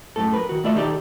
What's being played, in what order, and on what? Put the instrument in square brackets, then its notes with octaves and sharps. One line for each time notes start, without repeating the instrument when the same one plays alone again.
[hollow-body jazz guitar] F#2 A2 A4
A#4 B4
D#3 F#4
A2 A3 E4 F4 D5 E5
D#3 D#4 G4 A4 D5